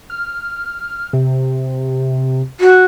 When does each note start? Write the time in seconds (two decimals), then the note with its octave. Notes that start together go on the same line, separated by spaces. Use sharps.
0.10 F6
1.13 C3
2.60 F#4